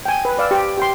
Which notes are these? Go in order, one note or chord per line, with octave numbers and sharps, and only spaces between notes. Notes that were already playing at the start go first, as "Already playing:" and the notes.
G5 G#5
B4
B4 D5 F5 E6
G4
G4 G5 C6